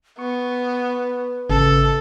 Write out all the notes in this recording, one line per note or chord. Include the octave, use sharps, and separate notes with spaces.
B3 B4 C#6
G#1 C#3 A4